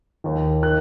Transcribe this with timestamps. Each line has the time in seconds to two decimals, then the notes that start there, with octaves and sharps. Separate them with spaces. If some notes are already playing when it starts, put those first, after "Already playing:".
0.24 D#2 D#3
0.63 D#3 F#6